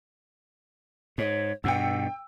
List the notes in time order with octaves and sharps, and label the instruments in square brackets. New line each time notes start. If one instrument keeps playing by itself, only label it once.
[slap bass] G#2 [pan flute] C#5
[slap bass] G2 B2 [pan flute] F#5 [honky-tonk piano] G5 E6